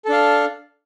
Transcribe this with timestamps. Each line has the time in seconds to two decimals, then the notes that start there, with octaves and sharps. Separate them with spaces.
0.05 A4
0.09 D4
0.13 F5